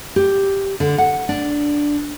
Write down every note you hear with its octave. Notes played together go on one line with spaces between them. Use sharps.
G4
D3
F#5
D4